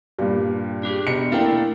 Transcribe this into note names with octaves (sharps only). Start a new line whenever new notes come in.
G2 A#2 G3
D4 G4 G#4
E1 C#7
A3 A#3 D4 E4 A#4 F5 G5